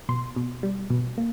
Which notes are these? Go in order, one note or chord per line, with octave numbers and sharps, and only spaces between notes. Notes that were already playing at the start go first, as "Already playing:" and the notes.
B2 C6
B2
G3
B2
A#3